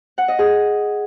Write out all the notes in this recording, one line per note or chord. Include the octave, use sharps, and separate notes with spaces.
F#5
D#5
G#4